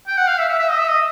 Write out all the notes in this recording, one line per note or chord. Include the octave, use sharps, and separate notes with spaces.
G5
F#5
F5
E5
E5
E5
D#5
E5
D#5